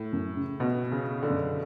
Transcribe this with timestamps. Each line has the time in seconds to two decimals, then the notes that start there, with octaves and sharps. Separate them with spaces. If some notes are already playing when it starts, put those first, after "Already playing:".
Already playing: A2
0.13 F#2
0.36 C#3
0.60 B2 B3
0.83 B3
0.92 C#3
1.07 B3
1.23 D3
1.30 F#2